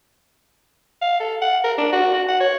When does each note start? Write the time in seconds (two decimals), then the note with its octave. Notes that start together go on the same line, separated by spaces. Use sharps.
1.02 F5
1.20 A4
1.42 F#5
1.64 A#4
1.78 D4
1.92 F#4
2.14 F#4
2.29 F#5
2.40 C#5